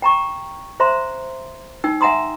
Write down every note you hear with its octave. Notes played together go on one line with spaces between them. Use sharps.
G5 A#5 C#6
C5 E5 A#5 C6
D#4 G5 E6
E5 F#5 G#5 A#5 C6 D#6